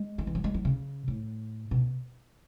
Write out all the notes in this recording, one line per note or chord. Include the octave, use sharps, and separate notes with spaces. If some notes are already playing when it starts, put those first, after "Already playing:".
Already playing: G#3
D#3
E3
F#3
G#3
F#3
C#3
A2
B2